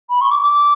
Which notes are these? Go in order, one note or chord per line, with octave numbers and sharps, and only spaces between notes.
B5
C#6
D6
D6